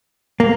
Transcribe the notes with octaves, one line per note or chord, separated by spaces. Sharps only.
A#3